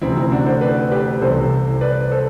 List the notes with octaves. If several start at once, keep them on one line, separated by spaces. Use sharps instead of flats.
D2 C3 E3 C4 E4
C4 E4
D4 F#4
A4 C5
B4 D5
G4 B4
C2 C3 E3 A4 C5
B4 D5
A4 C5